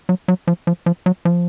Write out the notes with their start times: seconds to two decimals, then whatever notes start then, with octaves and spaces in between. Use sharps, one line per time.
0.09 F#3
0.28 F#3
0.47 F3
0.67 F3
0.86 F3
1.06 F#3
1.25 F3